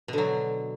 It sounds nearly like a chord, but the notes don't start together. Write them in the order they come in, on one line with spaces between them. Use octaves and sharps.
B2 D3 F#3